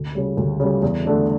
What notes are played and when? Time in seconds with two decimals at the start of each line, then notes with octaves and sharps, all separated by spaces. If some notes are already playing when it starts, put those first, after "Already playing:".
Already playing: D2
0.15 C#3 G3
0.37 D2
0.60 C#3 G3
0.83 E2
1.05 D3 A3 D4